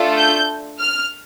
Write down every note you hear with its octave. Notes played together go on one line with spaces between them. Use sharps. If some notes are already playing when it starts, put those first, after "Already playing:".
Already playing: A3 D4 F4 A4
G6
F6